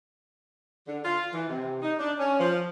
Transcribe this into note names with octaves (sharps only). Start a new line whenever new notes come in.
D3
F4
E3
C3
D#4
D4
C#4
F3